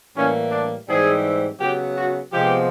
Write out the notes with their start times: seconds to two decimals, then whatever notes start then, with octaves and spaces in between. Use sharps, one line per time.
0.16 A2 E3 G3 A#3 C#4
0.51 D4
0.88 G#2 E3 G3 C4 G#4
1.60 C#3 F#3 B3 G4
1.97 F#4
2.32 C3 F3 G#3 B3 G4